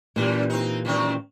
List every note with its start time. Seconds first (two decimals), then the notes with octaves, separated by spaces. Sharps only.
0.16 F#2 A#2 E3 G3
0.50 C4 D#4
0.85 F#2 D#3 C4